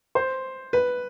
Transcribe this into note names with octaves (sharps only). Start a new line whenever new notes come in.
C5
B4